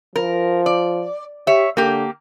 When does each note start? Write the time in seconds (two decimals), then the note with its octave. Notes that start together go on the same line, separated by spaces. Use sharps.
0.16 F3 A#4
0.66 D5
1.47 G4 C#5 E5
1.77 D3 A#3 G4